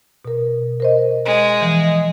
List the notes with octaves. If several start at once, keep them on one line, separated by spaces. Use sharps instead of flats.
B2 A#4
A#4 C5 D#5
G#3
E3 F3